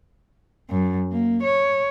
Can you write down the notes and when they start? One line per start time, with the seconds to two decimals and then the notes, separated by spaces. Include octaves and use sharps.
0.70 F#2
1.12 A#3
1.43 C#5